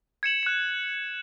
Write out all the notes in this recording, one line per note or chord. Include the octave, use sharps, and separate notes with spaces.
G#6 C#7 E7 F#7
F#6 C#7